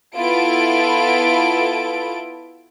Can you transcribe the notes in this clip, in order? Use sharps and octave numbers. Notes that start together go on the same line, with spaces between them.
B3 E4 F4 A4 D7